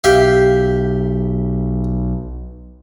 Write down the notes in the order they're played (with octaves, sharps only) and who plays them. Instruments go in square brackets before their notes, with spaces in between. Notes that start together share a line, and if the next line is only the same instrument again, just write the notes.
[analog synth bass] B1 [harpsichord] G4 E5 F5